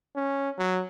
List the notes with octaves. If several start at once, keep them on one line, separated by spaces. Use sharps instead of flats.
C#4
F#3